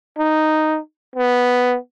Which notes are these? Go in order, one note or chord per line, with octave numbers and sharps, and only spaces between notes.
D#4
B3